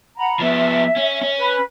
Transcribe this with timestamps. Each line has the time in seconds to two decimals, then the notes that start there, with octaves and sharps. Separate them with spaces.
0.17 F#5 A#5 B5
0.39 F3 B3 E5
0.96 C#4
1.21 C#4
1.37 B4